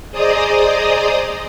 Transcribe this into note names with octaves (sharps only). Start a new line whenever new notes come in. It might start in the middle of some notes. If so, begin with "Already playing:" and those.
G#4 C5 D5 D#5 A#5 D#6